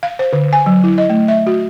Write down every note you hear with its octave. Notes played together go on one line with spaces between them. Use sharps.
F5
C5
D3
G#5
F#3
E4
D#5
A3
E5
F#4